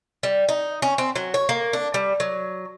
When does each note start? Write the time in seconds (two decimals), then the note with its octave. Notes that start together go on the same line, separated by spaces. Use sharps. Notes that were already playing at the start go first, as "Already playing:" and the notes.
0.23 G3
0.49 D#4
0.82 C#4
0.98 C4
1.16 F#3
1.34 C#5
1.49 A#3
1.73 D4
1.94 G3
2.20 F#3